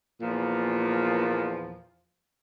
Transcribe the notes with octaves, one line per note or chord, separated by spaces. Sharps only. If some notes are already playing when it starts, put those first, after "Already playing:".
E2 A#2 F3 A#3